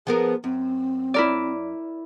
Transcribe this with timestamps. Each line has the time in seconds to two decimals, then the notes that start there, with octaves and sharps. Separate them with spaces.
0.07 F3 B3 G#4 A#4
0.44 F#2 C4
1.14 E4 A#4 D5